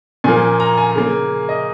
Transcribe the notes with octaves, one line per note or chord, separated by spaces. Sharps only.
A#2 F3 A#3 G#5
A#5
G#5
C#3 A#3
D#5